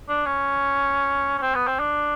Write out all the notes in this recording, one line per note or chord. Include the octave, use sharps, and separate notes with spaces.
D4
C#4
C#4
C4
B3
C4
D4